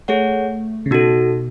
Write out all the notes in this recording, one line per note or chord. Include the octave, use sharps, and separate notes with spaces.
A3 G#4 C#5 F#5
C#3
B2 D#4 F#4 A4